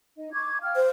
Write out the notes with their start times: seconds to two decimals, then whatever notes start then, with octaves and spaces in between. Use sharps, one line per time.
0.17 D#4 D#5
0.33 C#6 D6 G#6
0.62 F5 G5 F6
0.76 C5